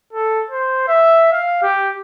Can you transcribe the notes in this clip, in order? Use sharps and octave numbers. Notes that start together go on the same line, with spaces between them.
A4
C5
E5
F5
G4